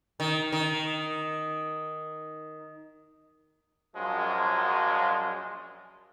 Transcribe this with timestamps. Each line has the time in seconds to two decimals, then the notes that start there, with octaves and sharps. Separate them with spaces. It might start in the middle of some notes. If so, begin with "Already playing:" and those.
0.20 D#3
0.52 D#3
3.96 A#1 F#2 F3 F#3 G#3 F4